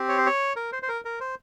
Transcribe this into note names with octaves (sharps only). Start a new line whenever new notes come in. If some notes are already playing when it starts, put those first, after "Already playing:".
Already playing: C4 G4
C#5
C5
C#5
A#4
C5
C5
A#4
A#4
C5